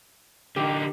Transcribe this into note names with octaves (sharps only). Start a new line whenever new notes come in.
D3 D#4 G4